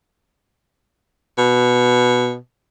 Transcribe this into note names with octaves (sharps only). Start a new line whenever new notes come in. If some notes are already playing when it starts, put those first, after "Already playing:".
B2